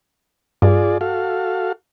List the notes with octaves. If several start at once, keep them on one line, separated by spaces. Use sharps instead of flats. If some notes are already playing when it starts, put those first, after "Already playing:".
G2 F4 G#4 D5
F#4 A4 F5